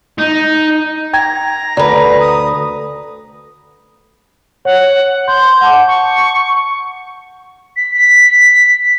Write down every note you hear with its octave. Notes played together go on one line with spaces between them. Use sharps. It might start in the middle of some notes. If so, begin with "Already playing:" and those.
D#4
G5 A#5 G#6
D2 B4 D5
D#6
C#5 F#5
C6 G6
F#5 A5 D6
C#6
B6
B6